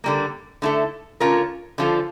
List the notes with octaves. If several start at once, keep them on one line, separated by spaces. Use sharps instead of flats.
D3 G3 A#3
D3 A3 E4 A4
D3 A3 C#4 F4 A#4
D3 F3 C#4 F4 A4